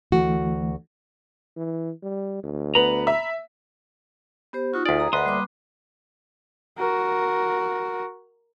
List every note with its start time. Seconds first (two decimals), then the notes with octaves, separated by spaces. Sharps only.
0.12 D2 E3 A3 F#4
1.56 E3
2.03 G3
2.43 D2
2.75 B3 A#5 B5
3.07 E5
4.53 B3 G4 C5
4.74 D#4 F4 F#4
4.86 D2 G#4 D5
4.97 A#5 D#6
5.13 D2 B4 D#5 F#5 C6 D#6
5.26 G3 A#3 D6
6.78 F#4 A#4